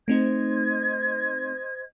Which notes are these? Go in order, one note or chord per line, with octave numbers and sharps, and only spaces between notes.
A3 C4 D#4 C5 D#5 G#6